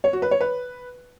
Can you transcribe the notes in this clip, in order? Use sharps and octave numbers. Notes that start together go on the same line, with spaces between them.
C#5
F#4
B4
C#5
B4